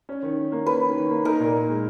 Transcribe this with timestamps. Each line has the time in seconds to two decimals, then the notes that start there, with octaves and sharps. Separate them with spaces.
0.09 C#4
0.23 D#3
0.37 D#3
0.52 A#3
0.66 C#4 B4
0.81 D#3
0.96 D#3
1.11 A#3
1.25 D#4 A#4
1.40 A#2
1.55 A#2
1.69 G#3